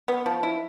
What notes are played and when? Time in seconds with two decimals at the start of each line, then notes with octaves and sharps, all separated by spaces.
0.08 B3
0.26 F3
0.43 E4